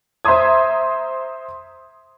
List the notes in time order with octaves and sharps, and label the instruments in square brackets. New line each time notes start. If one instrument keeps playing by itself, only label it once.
[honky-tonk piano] C5 E5 A#5 C6 D#6 G#6